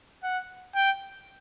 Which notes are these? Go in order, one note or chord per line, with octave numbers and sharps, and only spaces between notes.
F#5
G5